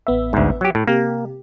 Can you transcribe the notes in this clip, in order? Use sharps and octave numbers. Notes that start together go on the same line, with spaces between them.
A1 B3 E5
D2 G#2
F#3 G4
A2
C3 A#3 G4